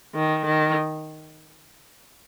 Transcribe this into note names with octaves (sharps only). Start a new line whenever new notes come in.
D#3
D#3